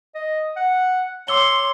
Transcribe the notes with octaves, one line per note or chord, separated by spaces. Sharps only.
D#5
F#5
C#5 C6 D6 E6 G7